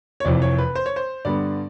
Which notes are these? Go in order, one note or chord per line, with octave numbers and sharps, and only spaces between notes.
C#5
F1 F2 C3 E3 D5
C#5
B4
C5
C#5
C5
G2 D3 G3 B3 D5